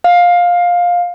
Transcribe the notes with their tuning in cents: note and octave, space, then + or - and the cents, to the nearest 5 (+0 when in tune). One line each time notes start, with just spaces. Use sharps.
F5 +15